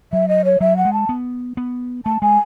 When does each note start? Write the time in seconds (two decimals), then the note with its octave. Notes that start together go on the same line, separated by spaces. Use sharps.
0.13 F#3 E5
0.28 D#5
0.45 C#5
0.61 F#3 E5
0.77 F#5
0.85 G#3
0.93 A5
1.09 B3
1.57 B3
2.06 A3 A5
2.22 G#3 G#5